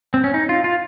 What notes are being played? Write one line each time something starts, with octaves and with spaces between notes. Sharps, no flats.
C4
C#4
D#4
F4
F4